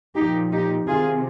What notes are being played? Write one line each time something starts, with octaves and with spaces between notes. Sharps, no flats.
A#2 F3 D#4 G4
D#4 G4
C3 D#3 F4 G#4